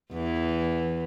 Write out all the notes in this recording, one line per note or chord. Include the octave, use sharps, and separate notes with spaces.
E2 E3